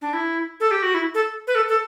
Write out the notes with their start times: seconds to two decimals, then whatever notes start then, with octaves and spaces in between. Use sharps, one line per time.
0.02 D4
0.13 E4
0.60 A4
0.71 G4
0.83 F#4
0.94 E4
1.14 A4
1.47 B4
1.55 A4
1.69 A4